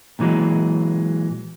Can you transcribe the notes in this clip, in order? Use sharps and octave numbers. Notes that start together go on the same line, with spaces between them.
A#2 D3 E3 F#3 G#3